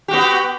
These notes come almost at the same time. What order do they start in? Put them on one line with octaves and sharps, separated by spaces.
G4 F#4 B3